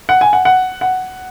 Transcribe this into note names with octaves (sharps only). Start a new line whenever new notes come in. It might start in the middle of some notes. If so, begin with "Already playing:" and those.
F#5
G#5
F#5
F#5
F#5